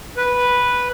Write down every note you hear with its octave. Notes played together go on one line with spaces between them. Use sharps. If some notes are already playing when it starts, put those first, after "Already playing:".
B4